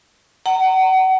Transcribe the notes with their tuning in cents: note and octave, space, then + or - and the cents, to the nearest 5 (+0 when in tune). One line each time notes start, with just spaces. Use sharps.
F#5 +30 A#5 -30